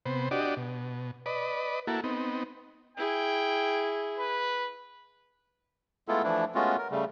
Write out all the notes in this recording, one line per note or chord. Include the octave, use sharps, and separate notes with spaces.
C3 B3 C5
D4 F#4 G4 D5 D#5
B2
B4 D5 D#5
A#3 E4 F#4 A4
B3 C4 D#4
E4 G#4 G5
B4
G#3 A3 B3 E4 F4 A4
E3 F3 A3 D4 E4
G#3 A3 B3 C#4 F4 F#4
A#4
C#3 G3 A3